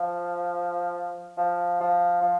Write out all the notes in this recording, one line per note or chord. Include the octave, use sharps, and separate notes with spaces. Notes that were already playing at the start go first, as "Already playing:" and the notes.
Already playing: F3
F3
F3
F3